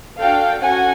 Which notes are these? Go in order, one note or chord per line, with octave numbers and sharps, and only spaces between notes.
D4 F#4 A4 F5 G5
C#4 F#4 A4 F#5 G#5